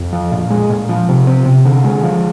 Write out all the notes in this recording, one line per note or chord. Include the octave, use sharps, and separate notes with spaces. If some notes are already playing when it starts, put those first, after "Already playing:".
Already playing: F2
F3
A#2
G#3
A#2
F3
C3
C4
C3
D3
G#3
F3